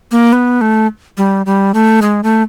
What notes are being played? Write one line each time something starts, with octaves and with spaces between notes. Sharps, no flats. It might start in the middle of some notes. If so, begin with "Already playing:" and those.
A#3
B3
A3
G3
G3
A3
G#3
A3